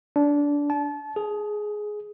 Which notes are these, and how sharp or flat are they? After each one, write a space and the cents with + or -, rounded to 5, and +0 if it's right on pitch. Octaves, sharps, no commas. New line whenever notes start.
D4 -20
A5 -30
G#4 +10